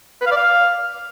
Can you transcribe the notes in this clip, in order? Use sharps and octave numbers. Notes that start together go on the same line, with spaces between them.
B4
F5
D5
F5